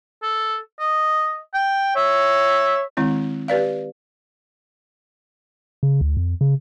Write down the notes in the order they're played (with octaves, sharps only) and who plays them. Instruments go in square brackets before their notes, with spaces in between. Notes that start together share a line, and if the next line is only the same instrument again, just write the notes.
[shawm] A4
D#5
G5
[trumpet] C#5 [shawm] E5
[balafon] D#3 G#3 C4 E4
G4 B4 D5 F5
[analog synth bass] C#3
D2
F2
C#3